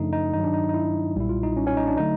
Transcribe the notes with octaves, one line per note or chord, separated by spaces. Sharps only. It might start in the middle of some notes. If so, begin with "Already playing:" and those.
Already playing: F#2 C#3 F3 A3 D4 D#4
D#4
G2 D#3 F#3 D#4
D4
D#4
D#4
E4
B1 A#2 G3 E4
F4
D#4
C#4
C#4
D#4
D4
D3 F#3 A3 D#4